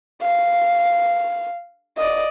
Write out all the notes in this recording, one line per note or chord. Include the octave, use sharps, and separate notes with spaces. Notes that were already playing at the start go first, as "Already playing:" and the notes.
F5
D5 D#5